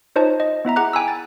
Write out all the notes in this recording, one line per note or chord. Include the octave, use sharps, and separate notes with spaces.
D#4 F4 C5 C#5 D#5 A5
D#5
B3 E4 E5 A#5
G#4 F#5 A#5 D6 F#6
G5 G#5 B5 E6
A6